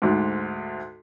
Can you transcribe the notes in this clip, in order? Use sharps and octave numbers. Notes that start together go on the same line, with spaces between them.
D2 G#2